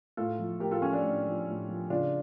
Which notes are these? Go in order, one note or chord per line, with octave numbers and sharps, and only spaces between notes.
A2 F4 A4
F3
A2 G4 A#4
F4 A4
F3 C#4
D4
A2
F3
A2
F3
C#3 D4 F4